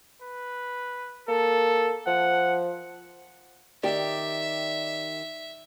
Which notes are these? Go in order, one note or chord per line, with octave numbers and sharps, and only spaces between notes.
B4
A#3 A4
F3 F#5
D#3 G4 D5 E5